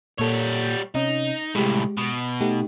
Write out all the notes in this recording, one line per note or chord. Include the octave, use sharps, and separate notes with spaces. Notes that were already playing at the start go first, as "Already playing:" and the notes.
A#2 G3 A#3 A4 C#5
C3 C#4 D#4
C2 A2 G#3 G4
B2
A3 D#4 G4